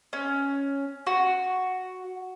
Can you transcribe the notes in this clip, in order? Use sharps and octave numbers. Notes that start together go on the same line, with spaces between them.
C#4
F#4